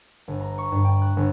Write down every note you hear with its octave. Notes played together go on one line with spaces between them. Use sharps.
G1
A#5
C#6
G2
G5
F#6
G1